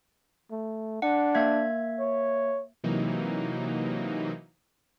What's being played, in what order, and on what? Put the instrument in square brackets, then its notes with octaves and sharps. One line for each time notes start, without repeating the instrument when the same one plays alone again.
[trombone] A3
[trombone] D4 [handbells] F#5
[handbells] A#3 E5 G#6
[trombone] C#5
[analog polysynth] C3 E3 F#3 A#3 D#4